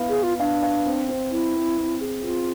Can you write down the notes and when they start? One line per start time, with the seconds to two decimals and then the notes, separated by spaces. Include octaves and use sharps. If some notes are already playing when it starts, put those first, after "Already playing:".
Already playing: B3 E4 F5
0.09 G#4
0.16 B4
0.23 F4
0.40 D4 F5
0.62 F5
0.85 C4
1.09 C4
1.31 C4 E4
1.54 C4
1.77 C4
2.01 G#4
2.23 C4 F4